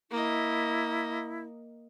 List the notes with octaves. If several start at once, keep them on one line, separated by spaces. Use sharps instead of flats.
A#3 E4 D#5